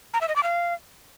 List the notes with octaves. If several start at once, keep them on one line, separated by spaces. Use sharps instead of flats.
A#5
E5
D#5
D6
F5